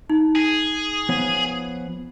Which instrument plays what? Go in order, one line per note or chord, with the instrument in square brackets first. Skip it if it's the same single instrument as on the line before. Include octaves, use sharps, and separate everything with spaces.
[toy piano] D#4
[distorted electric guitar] G#4
[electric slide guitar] F3 B3 C#5